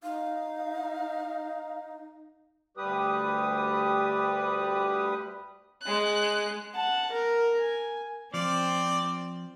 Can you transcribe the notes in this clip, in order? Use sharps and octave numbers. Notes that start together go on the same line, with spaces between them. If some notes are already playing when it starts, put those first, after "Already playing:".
D#4 F5
D2 G3 G4 B4 D#6
G#3 F#6
F#5 A5
A#4
G#5
F3 C4 D5